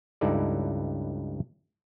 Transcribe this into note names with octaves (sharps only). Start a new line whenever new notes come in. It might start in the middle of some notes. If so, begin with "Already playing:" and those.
C#2 G2 D#4 E4 A4 D5